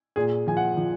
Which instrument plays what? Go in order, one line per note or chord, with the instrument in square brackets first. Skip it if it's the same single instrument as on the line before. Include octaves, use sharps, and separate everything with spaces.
[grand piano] A#2 G#4
F3 G#5
F#5
F3